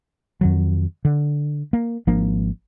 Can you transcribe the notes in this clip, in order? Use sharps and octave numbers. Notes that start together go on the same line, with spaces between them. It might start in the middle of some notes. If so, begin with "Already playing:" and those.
F2 D#3 F#3
D3
A#3
G#1 F3 A#3 D4